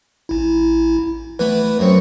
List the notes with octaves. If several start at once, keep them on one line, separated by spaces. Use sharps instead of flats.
A1 E4
E3 A3 B3 B4 B5
F#2 C4 C#6